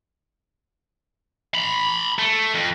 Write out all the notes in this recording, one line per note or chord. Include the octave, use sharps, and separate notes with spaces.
A#5 B5
A3
F2